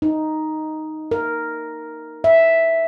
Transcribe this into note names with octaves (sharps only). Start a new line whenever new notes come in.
D#4
A#4
E5